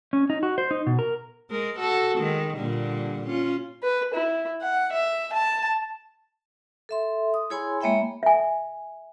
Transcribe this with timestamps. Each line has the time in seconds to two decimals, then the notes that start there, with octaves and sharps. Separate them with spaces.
0.13 C#4
0.30 D#4
0.43 F#4
0.58 C5
0.71 D#4
0.87 B2
0.99 A#4
1.50 G#3 A#4
1.79 F#4 A4
2.19 D#3 G#3
2.56 A#2 D3 G3
3.27 C#4 F4
3.83 B4
4.14 E4
4.61 F#5
4.92 E5
5.33 A5
6.89 A4 E5 C6
7.34 D#6
7.50 E4 G#4 C#5 G#5 B5 C6
7.81 G#3 A#3 C#5 E5 G5 B5
8.23 E5 G#5